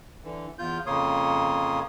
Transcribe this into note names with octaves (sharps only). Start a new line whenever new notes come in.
D3 E3
E2 F4 G6
F2 C#3 A#3 C#5 C6 D#6